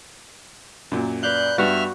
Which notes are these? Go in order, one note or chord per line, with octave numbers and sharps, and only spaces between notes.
F#2 A#2
B4 D5 F5 F#6 G6
G2 G3 B3 F#4 E5 F6